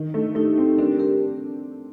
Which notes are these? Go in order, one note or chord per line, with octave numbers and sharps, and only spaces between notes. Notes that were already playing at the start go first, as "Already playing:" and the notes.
Already playing: D#3 D#4
A3
A3 D#4 G4
C4
D4 G4 A#4
D4 G4 A#4